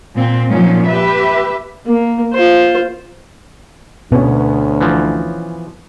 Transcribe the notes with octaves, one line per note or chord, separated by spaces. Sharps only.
A#2 C4
A#2 F3 F#3 C#4 D#4
G4 B4 E5
A#3
F4 C5
D2 B2 B3 C#4
E3 F3